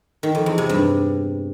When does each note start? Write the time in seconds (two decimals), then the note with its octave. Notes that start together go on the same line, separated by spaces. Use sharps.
0.23 D#3
0.35 F2
0.46 E2
0.58 C3
0.69 G2